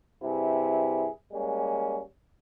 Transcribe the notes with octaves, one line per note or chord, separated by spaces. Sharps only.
G2 C3 E4 G#4
G3 G#3 A#3 C#4